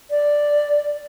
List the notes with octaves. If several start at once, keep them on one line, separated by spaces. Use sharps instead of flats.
D5